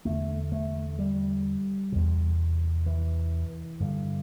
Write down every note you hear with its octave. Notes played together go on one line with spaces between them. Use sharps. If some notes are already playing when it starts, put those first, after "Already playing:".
E2 D3 A3
A3
G3
E2 C3
E3
G2 D3